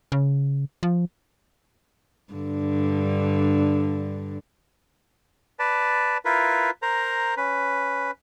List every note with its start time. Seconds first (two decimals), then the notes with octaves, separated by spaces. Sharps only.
0.12 C#3
0.83 F3
2.33 G2 D3
5.59 B4 D5 A5
6.25 E4 F4 A#4 B4
6.82 A#4 C5 A#5
7.37 C#4 B4